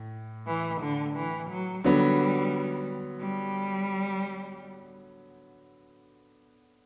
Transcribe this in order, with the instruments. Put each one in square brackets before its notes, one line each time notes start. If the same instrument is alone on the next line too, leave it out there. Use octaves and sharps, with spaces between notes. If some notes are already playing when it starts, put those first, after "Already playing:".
Already playing: [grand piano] A2
[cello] E3
D3
E3
F#3
[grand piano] D3 F#3 B3 [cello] G3
[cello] G3